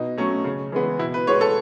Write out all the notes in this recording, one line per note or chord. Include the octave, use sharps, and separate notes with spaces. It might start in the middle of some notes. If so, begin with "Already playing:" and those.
Already playing: B2 D#4
F#3 A3 C#4
C#3
E3 G#3 B3
B2 E4
B4
G#3 B3 C#5
A4